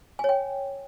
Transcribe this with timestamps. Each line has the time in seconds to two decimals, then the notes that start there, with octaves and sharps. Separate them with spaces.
0.19 G#5
0.24 C#5
0.29 G5